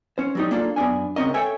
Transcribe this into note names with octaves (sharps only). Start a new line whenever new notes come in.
C#4 C5
F#3 G3 D#4
A#3 D4 F4 A4
F#2 B3 D4 G#5
C#2 C#3 C4 C#4 A#4 D#5
A4 C#5 E5 G5 G#5